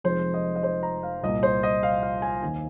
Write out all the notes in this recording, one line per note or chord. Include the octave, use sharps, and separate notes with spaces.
F1 F2 F3 G#3 C4 C5
D#5
D#5
C5
A#5
F5
C2 A#2 A#3 D#5
C5
D#5
F5
F5
G#5
D#2 D#3 A#3 D#4 G#5